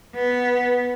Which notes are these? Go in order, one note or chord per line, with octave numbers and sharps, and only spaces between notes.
B3